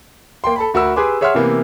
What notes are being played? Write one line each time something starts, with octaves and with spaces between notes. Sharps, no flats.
A#3 G5 C6
A4 A5 B5
D2 F#4 A#4 B5 E6
G4 G#4 B4 G#5 C6 D6
G#4 C#5 E5 F#5 C6 F6
C3 E3 A#3 B3